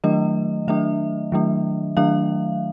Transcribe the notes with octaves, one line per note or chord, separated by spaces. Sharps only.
D#3 F#3 A3 D4 D#5
D#3 F#3 A3 D4 E5
D#3 F#3 A3 D4
D#3 F#3 A3 D4 F5